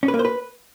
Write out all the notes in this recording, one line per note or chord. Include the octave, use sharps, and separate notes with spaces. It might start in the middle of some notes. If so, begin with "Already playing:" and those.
C#4
B4
A#3
C5
B4